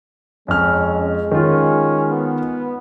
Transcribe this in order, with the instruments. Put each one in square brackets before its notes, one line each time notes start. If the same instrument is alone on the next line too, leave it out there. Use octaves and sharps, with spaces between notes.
[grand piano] F2 F6 [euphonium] G#3 [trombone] C#4
[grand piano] D#3 F4 [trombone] C#4
[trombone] B3